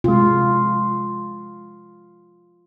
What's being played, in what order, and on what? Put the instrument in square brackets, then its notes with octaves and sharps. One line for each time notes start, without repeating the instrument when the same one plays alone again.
[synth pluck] C3 G#3 [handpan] F4